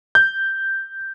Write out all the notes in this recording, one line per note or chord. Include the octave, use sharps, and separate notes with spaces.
G6